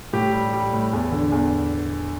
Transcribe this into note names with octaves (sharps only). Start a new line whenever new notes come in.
A2 G4
G3
G3
A2
E2
D3
E2